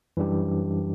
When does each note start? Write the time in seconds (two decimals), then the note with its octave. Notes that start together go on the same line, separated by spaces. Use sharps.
0.17 F#2 E3 G3 D4 G4